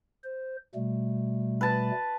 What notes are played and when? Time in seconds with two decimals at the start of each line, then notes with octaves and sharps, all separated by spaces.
0.24 C5
0.75 B2 G3 A3
1.61 B4 A5